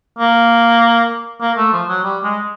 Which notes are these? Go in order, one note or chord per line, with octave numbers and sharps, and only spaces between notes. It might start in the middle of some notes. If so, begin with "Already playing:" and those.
A#3
A#3
A3
F3
F#3
G3
G#3